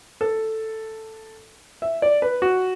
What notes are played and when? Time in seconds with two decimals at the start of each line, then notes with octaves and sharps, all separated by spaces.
0.21 A4
1.82 E5
2.02 D5
2.22 B4
2.42 F#4